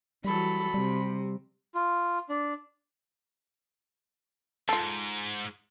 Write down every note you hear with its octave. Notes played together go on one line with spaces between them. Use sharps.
E3 F#3 G3 A4 B5
C3 G3
F4
D4
G#2 F4 A4